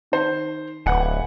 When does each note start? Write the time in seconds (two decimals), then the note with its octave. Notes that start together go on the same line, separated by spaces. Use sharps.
0.12 D#3 C5
0.86 D1 B4 F#5 G#5